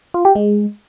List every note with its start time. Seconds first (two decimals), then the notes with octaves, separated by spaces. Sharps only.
0.14 F4
0.25 G4
0.35 G#3